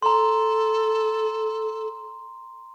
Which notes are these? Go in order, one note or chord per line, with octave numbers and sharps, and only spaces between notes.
A4 A#5 C6